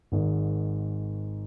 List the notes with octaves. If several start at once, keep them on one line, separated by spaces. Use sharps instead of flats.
G#1 G#2 D#3